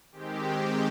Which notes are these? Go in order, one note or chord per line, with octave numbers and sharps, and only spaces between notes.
D#3 G#3 C4 G4